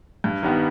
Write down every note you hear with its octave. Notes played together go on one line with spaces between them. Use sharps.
G2
D#3 G3 B3